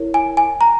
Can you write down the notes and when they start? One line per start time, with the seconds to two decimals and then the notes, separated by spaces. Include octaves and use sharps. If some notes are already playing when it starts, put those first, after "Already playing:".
Already playing: E4 A#4 C#5
0.14 G#5
0.37 G#5
0.61 A#5